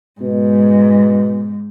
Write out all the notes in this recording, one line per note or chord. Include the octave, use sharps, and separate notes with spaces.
G#2 B2